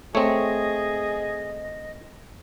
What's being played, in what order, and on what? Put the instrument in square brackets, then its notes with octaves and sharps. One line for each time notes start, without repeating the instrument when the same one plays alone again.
[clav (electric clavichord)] A3 C4 [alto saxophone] G#4 [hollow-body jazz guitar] C#5 [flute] D#5